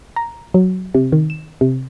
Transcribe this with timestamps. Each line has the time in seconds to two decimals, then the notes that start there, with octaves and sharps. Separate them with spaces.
0.16 A#5
0.54 F#3
0.95 C3
1.12 D#3
1.30 E7
1.61 C3